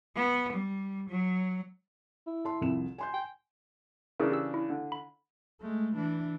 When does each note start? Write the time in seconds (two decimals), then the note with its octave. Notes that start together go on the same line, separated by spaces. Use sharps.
0.16 B3
0.53 G3
1.10 F#3
2.27 E4
2.45 A5 C6
2.61 C2 F2 E7
2.98 G#5 C6 G6
3.14 G5
4.20 C#3 E3 D4 G#4 A#4
4.32 G4 E6
4.54 E4
4.70 D3
4.92 B5
5.61 G#3 A3
5.96 E3 D4